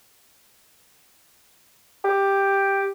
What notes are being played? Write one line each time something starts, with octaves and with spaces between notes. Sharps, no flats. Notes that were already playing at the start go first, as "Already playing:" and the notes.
G4